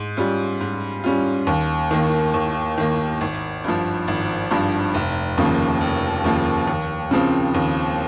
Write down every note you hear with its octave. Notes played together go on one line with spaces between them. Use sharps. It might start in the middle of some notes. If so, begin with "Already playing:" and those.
Already playing: G#2
G3 C#4 F4
G#2
G3 C#4 F4
D#2
D#3 A#3
D#2
D#3 A#3
G#1
G2 F3
G#1
G2 F3
F1
D#2 C#3 F3 A#3
F1
D#2 C#3 F3 A#3
D#2
C#3 F3 C4
D#2